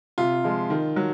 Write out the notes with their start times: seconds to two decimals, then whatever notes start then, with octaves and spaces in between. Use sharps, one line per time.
0.18 C3 F4
0.44 F3 G#3
0.70 D#3
0.96 F#3